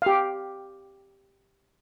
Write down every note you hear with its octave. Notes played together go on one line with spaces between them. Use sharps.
G4 F5